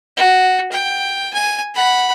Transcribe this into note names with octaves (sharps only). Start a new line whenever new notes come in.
F#4
G5
G#5
F#5 B5